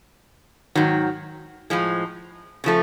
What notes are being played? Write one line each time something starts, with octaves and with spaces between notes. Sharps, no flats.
G#2 D#3 F#3
A2 F3 G#3
C#3 F3 A3